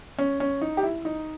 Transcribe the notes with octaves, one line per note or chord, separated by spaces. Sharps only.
C#4
C#4
D#4
G4
E4
D#4